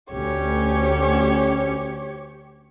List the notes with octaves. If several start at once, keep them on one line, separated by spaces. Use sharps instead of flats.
D2 C#4 G4 C#5